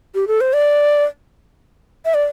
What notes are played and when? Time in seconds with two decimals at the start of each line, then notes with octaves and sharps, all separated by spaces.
0.15 G4
0.28 A4
0.41 C5
0.53 D5
2.05 E5
2.14 D5